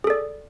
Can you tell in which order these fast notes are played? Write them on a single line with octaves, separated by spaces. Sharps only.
G#4 A4 D5